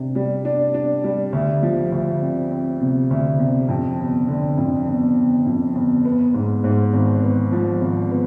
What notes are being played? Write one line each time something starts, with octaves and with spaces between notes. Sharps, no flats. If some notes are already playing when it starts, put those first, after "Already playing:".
Already playing: C3 D4
G3
D4
D4
G3
D2
F3
D2
C4
C4
C3
D2
C3
F2
G1
D3
F2
G1
G1
F2
G1
B3
G#2
G#2
G#1
B3
F3
G#1
B3